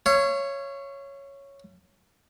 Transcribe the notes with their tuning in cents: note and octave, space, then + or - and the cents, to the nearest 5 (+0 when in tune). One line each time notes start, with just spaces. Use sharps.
C#5 +0 F5 -40